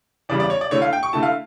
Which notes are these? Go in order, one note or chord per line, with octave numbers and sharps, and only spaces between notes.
E2 C#3 G3 D5
D5
C#5
D5
D3 A3 E4 C#5
F5
G5
C#6
D3 A3 E4 A5
F5